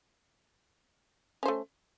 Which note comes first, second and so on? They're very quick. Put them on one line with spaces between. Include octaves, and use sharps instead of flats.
C#4 C5 A3